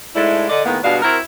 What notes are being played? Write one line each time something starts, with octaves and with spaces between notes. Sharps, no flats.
G#2 G#3 A3 D4 E4
D3 D5 D#5
A2 D#3 G#3 A#3 B3
G2 B2 G#3 D4 F#4 F5
C4 E4 F#4 A#4